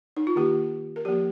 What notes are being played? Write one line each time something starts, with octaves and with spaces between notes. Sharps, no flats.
D#4
F4
D#3 A#3 G4
A#4
F3 A#3 G4